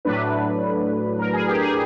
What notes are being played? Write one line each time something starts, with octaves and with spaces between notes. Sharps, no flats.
A2 F#3 A3 D4 B4
A#4
G#4
G4
G#4